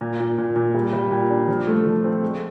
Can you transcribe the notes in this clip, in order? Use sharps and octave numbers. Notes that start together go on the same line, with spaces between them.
A#2
A#2
A#2
A#2
G3
G3
A#2
D4
F3
A3
F3
C4
G#3